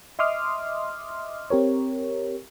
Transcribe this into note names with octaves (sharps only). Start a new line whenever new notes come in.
D#5 E5 C6 D6 D#6 F6
C4 G4 A#4 C#5